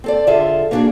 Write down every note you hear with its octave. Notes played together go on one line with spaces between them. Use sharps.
C4 A4 D5
D3 F4 G#4 A4 E5
A#3 B3 D4 D#4 F#4 G#4